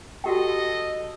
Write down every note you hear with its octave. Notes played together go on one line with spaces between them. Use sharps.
F#4 G4 A4 D#5 G5